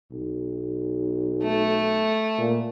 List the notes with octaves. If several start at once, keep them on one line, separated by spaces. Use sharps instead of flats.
B1
A3
A#2